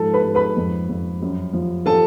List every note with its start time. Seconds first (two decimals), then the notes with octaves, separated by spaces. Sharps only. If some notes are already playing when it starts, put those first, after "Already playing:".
Already playing: G#2 F3 A4 A5
0.13 B4 B5
0.24 G#2
0.35 B4 B5
0.57 F2
0.89 F2
1.22 F#2
1.53 F3
1.86 F3 A4 A5